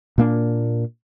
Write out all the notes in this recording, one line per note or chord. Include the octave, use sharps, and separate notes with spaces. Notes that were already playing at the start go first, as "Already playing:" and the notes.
A#2 A#3 D4